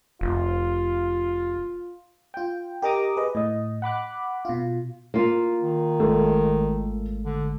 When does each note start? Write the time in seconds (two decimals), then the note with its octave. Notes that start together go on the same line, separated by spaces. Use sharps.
0.21 F1 F4
2.34 F4 G5
2.82 G4 A#4 D#5 A#5 D6 D#6
3.16 G#4 B4 D#5
3.35 A2 D#5
3.82 F#5 B5 D6 F#6
4.45 B2 F4
5.14 A#3 F4
5.62 D#3
6.00 G#1 G#3 A3 A4
7.24 D3